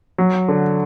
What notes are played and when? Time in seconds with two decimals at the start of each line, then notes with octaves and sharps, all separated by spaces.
0.18 F#3
0.48 D3